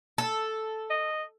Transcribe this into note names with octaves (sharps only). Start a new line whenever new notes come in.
A4
D#5